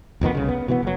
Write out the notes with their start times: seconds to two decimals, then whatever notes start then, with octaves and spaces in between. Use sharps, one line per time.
0.21 F1 F2 D#3 B3
0.35 C2 C#3
0.49 B3
0.68 B2 E3 G#3 B3
0.83 F#1 F#3